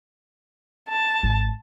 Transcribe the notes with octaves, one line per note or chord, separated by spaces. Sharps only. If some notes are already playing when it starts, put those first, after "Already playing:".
A5
G#1